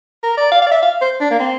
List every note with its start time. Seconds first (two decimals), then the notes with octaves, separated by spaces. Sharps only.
0.23 A#4
0.37 D5
0.52 F5
0.62 F5
0.67 D5
0.72 E5
0.82 F5
1.01 C5
1.21 D4
1.30 A#3
1.40 C4